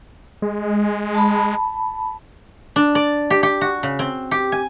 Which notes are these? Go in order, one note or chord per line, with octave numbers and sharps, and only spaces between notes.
G#3
A5 B5
D4
D5
G4
G4
F#4
C#3
C4
G4
G#5